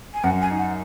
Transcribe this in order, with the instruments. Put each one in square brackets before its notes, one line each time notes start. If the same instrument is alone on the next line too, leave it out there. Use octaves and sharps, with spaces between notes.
[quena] G#5
[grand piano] F#2 [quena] F#5
[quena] G#5
[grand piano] D#4
[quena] F#5